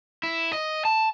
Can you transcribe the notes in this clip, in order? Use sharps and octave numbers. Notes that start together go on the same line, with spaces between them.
E4
D#5
A5